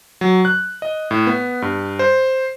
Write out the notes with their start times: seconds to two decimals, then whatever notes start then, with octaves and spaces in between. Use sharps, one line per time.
0.21 F#3
0.45 F#6
0.82 D#5
1.11 A2
1.27 B3
1.62 G2
1.99 C5